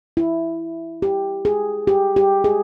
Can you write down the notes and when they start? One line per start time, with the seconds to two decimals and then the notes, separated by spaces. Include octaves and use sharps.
0.17 E4
1.02 G4
1.45 G#4
1.87 G4
2.16 G4
2.44 G#4